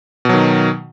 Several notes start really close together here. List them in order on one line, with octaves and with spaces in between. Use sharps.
B2 F#3 D#3